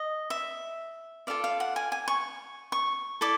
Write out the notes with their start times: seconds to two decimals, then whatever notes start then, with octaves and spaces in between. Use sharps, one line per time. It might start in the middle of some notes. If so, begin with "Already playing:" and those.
Already playing: D#5
0.30 E5
1.27 F4 A4 D5 F5
1.44 F5
1.60 F#5
1.76 G#5
1.92 G#5
2.08 C#6
2.72 C#6
3.21 E4 A4 D5 D6